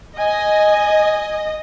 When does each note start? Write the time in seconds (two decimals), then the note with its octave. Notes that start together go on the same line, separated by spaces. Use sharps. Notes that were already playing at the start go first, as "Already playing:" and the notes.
0.18 D#5 G#5